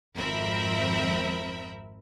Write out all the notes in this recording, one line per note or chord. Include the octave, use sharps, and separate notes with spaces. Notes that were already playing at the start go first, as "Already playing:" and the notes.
G#1 F2 C4 A#4 E5 B5